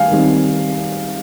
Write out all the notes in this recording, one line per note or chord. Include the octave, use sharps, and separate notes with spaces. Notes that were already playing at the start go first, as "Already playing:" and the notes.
Already playing: D#3 G3 F5 G#5
D#3 G3 C4 D#4